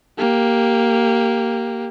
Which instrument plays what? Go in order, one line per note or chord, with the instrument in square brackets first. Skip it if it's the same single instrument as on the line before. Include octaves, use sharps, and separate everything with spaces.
[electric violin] A#3 G4